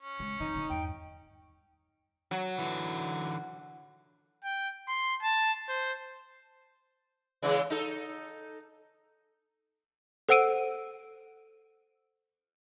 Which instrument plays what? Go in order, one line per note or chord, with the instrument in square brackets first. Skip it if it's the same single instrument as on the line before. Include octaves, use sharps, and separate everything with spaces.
[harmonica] C#4
[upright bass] C#3 G#3
[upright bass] F2 D#3 [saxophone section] D#4
[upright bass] D3 D#3
[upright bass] E2 G2 [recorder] G5
[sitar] F#3
[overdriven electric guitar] D3 E3
[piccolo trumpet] G5
C6
A5
C5
[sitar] C#3 E3 G#3
D#4 A4
[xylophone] A4 C5 F#5 E6 D7 D#7